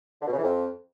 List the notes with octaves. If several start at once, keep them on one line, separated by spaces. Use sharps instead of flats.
D3
B2
C#3
E3
F2